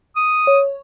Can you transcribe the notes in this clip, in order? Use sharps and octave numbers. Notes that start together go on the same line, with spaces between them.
D#6
C#5